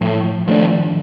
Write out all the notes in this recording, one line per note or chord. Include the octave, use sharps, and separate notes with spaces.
A2 F3 A3
F3
D#3 F3 A3 D4
F3